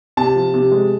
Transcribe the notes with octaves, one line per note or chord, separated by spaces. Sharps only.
C3 A5
F3
C3
G#3